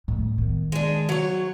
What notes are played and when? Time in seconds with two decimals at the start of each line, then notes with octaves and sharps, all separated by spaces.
0.08 A2
0.38 D#3 B3
0.72 G#3 D4
1.09 F#3 C#5